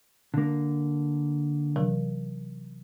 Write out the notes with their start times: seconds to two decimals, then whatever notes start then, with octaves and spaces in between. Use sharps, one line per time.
0.34 D3 A#3
1.76 C3 E3 F#3